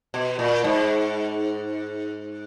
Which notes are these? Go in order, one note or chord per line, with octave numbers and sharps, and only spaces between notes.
B2
A#2
G#2